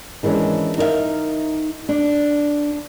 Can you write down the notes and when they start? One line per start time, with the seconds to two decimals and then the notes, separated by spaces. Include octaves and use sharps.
0.23 D#3 E3 G#3 C#4 D4
0.78 D#4 A#4 C5 E5 F5
1.89 D4